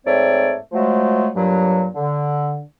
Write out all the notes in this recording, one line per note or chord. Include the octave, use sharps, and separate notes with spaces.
G#2 A3 C4 C#5 D5
F3 F#3 G#3 A3
G2 A#2 F#3
D3